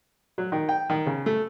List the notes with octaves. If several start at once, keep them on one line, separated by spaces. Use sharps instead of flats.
F#3
D#3
G5
D#3
C#3
A3